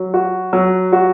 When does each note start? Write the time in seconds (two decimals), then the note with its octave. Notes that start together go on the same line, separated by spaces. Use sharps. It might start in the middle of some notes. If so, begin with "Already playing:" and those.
Already playing: F#3
0.14 F#4
0.53 F#3
0.93 F#4